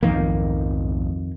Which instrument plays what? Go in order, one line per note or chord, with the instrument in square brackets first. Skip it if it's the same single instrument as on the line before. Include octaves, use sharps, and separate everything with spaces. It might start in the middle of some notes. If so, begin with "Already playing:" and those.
[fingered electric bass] B1 G#2 F3 [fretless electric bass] F2 D#3 A#3